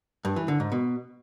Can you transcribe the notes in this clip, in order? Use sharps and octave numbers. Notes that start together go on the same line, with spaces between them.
G2
E3
D3
G#2
B2